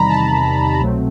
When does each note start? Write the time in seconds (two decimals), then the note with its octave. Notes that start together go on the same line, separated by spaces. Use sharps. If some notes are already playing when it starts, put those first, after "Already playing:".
Already playing: E2 C3 D#3 G3 A#5 B5
0.08 A5
0.80 C2 B2 F#3 A3 C4